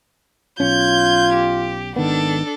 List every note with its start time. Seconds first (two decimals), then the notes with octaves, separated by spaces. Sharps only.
0.60 B1 C#4 F4 G6 G#6
1.33 G4
1.96 G#1 D#3 B3 D4 A4